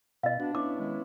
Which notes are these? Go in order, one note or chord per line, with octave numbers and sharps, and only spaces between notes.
B2 D#5 F5
B3 D4 F#4
B3 C#4 E4 D6
D#3 G#3